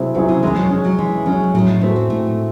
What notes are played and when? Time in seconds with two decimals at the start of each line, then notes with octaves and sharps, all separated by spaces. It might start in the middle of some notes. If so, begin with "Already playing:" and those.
Already playing: C3 F#3 C4 E4 G#4
0.15 C#3 F#3 C4 E4 G#4
0.29 C#3
0.43 D#3 G#3
0.56 F#3
0.70 C#4 G#4
0.84 F#3
0.98 E3 G#3
1.26 F#3 C#4 G#4
1.54 A2 F#3
1.68 G#3
1.81 G#3 A3 C4 F#4 A4
1.96 C4
2.10 A2 A3